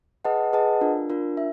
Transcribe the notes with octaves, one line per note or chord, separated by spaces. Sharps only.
G#4 B4 D#5 F#5 A5
G#4 B4 D#5 F#5 A5
D4 F4 A#4
D4 F4 A#4
E5